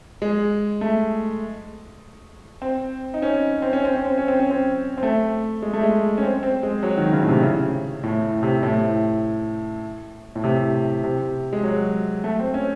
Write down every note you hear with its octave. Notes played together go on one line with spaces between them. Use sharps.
G#3
A3
C4
D#4
C#4
C4
C#4
C4
C#4
C4
C#4
C4
C#4
C4
C4
A3
G#3
A3
G#3
C#4
C4
C4
G#3
F#3
D#3
C#3
A2
C3
C#3
A2
C3
A2
A2
C3
C3
G#3
F#3
A3
C4
C#4